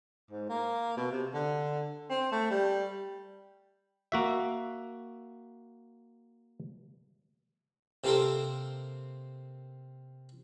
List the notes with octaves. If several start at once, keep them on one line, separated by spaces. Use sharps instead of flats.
G#2
A#3
B2
C3
D3
C4
A3
G3
A#3 F#4 E5
C3 A#3 C4 A4 A#4 C6